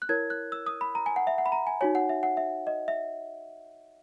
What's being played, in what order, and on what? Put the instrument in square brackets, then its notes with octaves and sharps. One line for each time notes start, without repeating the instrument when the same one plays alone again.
[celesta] F#6
E4 A#4 C#5 G#6
F#6
E6
D#6
B5
A#5
G#5
F#5
E5
F#5
B5
A#5
G#5
D#4 F#4 C#5 G#5
F#5
E5
F#5
E5
D#5
E5